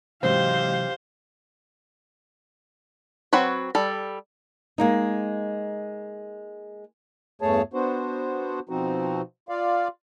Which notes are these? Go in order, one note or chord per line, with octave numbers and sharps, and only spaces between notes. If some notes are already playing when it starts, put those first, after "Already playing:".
G#2 C3 E3 F#3 C4 G4 C5 F5
F#3 C4 F#4 B4 C#5
G3 A4
G#3 A#3 D#4
E2 G2 A3 G#4 C#5 A5
B3 D4 F#4 C5
B2 F3 C4 D#4 F#4
F4 D5 F5